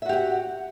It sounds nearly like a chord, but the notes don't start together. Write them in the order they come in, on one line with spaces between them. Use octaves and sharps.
E5 F#4 G4 F#5